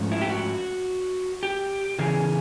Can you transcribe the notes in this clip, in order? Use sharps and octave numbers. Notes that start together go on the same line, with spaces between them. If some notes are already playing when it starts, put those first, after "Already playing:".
Already playing: G#2 F3 A3 C#4
E4
G4
F#4
G4
C#3 E3 C#4 G#4